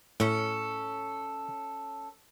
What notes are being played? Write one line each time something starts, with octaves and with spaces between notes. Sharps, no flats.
A2 C#4 A4